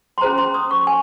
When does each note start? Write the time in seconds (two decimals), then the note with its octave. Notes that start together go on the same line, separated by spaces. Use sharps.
0.18 C6
0.21 C#4 G#4 C5 A#5
0.38 C6
0.54 D#6
0.71 C#6
0.87 G#5